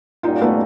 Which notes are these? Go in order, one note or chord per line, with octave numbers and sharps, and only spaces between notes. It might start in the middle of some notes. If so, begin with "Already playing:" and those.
A#2 G3 A#3 C#4 D#4 F4 F#4
A3 B3